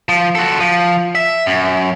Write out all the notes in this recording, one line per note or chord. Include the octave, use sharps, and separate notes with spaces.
F3
F#4 A4
F3
E5
F#2